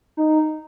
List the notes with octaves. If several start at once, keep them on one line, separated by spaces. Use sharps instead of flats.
D#4